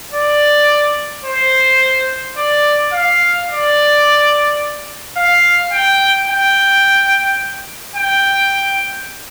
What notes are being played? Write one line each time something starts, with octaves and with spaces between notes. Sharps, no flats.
D5
C5
D5
F5
D5
F5
G5
G5
G5